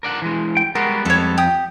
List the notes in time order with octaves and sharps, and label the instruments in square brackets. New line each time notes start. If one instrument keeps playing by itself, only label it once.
[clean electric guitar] A#4 D5 F#5
E3 G#3
[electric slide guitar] G5
[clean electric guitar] G3 G#3 B3 [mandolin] F#4 [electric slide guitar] A#4
[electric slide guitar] F2 [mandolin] A4 C#5
[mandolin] G4 D#6